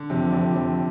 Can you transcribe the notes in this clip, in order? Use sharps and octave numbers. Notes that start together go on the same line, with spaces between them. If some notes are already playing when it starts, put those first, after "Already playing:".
Already playing: D3
F2 C3
F2
F2